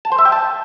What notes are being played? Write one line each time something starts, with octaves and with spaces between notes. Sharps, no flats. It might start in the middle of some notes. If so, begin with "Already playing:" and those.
A5
C5
E5
G5
A5